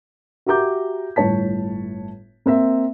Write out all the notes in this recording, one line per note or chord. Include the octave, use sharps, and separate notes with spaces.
F#4 G4 E5 A#5 D6 G6
G1 A2 C#5 A5 B6
A#3 C4 E5